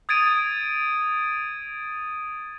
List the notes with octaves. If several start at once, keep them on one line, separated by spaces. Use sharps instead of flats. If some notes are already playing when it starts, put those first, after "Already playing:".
D#6 G#6 A6 D7 D#7